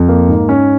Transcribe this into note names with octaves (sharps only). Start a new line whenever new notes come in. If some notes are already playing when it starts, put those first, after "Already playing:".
Already playing: F2
A#3
G#2
C#4